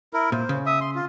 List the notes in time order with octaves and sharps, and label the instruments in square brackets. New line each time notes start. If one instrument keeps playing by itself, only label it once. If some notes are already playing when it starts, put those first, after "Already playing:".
[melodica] E4 A#4
[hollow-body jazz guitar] A#2 [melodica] C5
[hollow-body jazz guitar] C#3
[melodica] E5 D#6
C6
F4